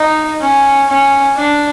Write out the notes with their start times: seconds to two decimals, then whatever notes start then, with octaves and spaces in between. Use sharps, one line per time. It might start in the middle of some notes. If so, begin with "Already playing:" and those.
Already playing: D#4
0.41 C#4
0.89 C#4
1.36 D4